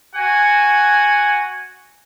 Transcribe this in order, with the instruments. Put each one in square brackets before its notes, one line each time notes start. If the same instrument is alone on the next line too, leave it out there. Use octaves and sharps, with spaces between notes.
[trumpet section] F#4 F#5 G#5